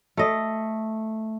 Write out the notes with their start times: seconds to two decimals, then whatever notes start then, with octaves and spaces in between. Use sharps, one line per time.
0.17 A3 D#5